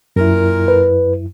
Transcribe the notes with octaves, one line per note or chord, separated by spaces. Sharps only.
F#2 A#2 E4 A#4
B4